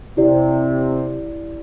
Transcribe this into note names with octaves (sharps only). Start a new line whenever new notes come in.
C3 E4 G4 D5